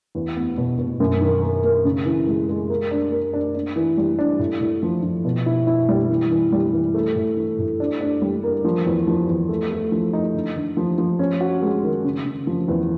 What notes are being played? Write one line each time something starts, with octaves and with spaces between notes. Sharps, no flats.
E2
B3
B2
B2
F#2
D#3
A#3
A#3
C#3
E3
G#3
G#3
A#3
D4
A#3
D4
D4
E3
G3
D4
A2
A2
F3
F3
B2
E4
E4
G3
E3
E3
G3
E3
A3
A2
E3
A2
D4
D4
G3
A#3
F3
E2
F3
E2
A3
A3
F3
D#4
D3
D3
F3
F3
C#4
F#4
G#3
D#3
C#3
C#3
F3
E2